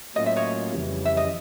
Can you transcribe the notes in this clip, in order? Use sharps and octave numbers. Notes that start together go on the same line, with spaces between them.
A2 F#3 A#3 C#4 F4 D#5
E5
C#5 D#5
F2 C#3 E3 G3
E5
D#5